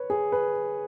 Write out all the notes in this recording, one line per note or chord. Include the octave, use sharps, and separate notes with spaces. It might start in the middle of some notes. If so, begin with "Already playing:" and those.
Already playing: B4 C#5
G#4
B4